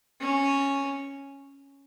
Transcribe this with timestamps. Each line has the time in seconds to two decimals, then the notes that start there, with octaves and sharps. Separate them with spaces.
0.21 C#4